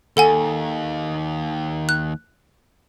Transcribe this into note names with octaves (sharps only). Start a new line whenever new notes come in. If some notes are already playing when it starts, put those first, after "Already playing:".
D#2 A4 F#5 G#5
F#6